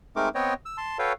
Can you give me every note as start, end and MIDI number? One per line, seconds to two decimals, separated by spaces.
0.16 0.29 56
0.16 0.29 57
0.16 0.29 60
0.16 0.29 63
0.16 0.29 70
0.16 0.29 86
0.35 0.54 59
0.35 0.54 60
0.35 0.54 73
0.35 0.54 75
0.35 0.54 79
0.65 0.77 88
0.78 0.98 81
0.78 0.98 84
0.99 1.13 66
0.99 1.13 69
0.99 1.13 71
0.99 1.13 73
0.99 1.13 77
0.99 1.13 79